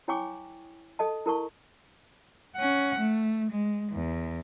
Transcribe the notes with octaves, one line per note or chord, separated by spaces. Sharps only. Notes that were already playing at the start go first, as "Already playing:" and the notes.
E4 C#5 G5 G#5 C#6 D6
A4 D#5 A5
E4 A#4 A5 C#6
C#4 F#5
A3
G#3
E2